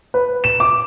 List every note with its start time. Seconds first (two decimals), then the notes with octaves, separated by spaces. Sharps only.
0.14 B4
0.44 E7
0.60 D6